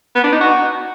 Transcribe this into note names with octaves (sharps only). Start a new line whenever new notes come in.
B3
D4
D#4
F#4